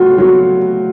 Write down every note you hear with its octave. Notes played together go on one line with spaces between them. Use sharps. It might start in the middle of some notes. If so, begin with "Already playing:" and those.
Already playing: A2 F#3 F4 F#4
F#3